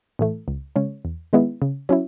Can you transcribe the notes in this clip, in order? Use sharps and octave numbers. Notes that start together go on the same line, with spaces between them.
A2 E3 A3
C#2
C#3 G#3 C#4
E2
D#3 G#3 B3 E4
C#3
F#3 C#4 E4